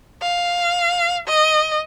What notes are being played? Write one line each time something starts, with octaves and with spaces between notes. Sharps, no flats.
F5
D#5